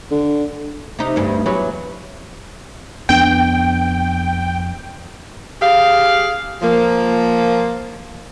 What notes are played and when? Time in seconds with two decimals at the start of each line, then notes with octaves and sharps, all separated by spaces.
0.11 D3
0.99 C3 D#4
1.16 D2 G2
1.46 E2 F#3 B4
3.09 F2 B3 D4 G5
5.61 G4 G#4 F5
6.62 F3 A#3